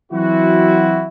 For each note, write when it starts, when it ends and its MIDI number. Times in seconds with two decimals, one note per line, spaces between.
0.12 1.06 52
0.12 1.06 54
0.12 1.06 60
0.12 1.06 64
0.12 1.06 66